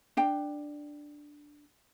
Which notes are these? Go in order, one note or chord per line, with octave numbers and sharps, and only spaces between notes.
D4 G5